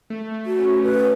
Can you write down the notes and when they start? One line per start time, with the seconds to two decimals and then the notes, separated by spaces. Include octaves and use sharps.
0.10 A3
0.34 A3
0.46 F#4
0.59 C#4
0.82 A3 B4